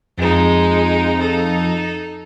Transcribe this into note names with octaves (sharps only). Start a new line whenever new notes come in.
F2 G#3 D#4
D#4 A4